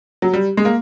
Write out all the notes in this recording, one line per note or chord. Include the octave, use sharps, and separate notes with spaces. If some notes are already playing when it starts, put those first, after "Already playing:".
F#3
G3
G#3
A#3